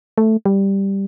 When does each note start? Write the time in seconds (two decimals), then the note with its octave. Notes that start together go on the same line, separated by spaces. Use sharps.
0.18 A3
0.46 G3